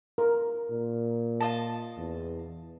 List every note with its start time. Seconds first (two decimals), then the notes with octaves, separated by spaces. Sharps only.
0.18 A#4
0.70 A#2
1.40 F4 D#5 A5
1.97 E2